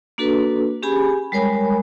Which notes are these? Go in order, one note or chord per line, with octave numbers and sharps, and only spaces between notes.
A#3 D4 F#4 A4 B4
C#4 G4 G#4 G#5 B5
G3 G#3 A#4 C#5 G#5 B5